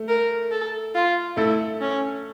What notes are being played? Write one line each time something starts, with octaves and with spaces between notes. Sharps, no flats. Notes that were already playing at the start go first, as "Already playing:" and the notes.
Already playing: A3
A#4
A4
F4
A3 E4 A4
C#4